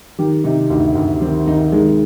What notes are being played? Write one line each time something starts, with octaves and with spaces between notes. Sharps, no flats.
D#3 G4
C3 D#4
D2 D#4
D2
D#3 C4
D#3 D#4
D#3 G#3